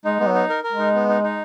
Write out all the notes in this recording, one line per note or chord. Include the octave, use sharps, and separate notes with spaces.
G#3 D#4
G#3 B3
F#3
D#4
A#4
A#4
G#3
D#4
B3
D#4
D#4